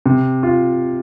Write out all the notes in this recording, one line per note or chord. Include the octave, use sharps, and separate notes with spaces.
C3
F4